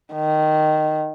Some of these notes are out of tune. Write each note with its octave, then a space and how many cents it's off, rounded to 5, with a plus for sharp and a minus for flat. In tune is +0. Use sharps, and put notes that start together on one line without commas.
D#3 -10